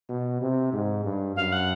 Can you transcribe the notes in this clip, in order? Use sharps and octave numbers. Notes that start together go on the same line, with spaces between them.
B2
C3
G#2
G2
F#2 F5
F#5